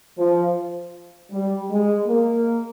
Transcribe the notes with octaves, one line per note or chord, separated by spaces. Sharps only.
F3
G3
G#3
A#3